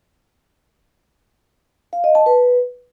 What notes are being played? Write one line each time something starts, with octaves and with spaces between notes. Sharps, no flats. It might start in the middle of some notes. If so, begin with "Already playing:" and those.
F5
D#5
A5
B4